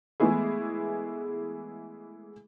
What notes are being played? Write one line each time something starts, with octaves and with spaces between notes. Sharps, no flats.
E3 G#3 A3 B3 E4 G#4